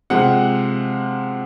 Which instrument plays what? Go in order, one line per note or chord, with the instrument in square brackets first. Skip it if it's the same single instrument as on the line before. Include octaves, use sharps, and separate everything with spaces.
[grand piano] C3 F3 G#3 F#5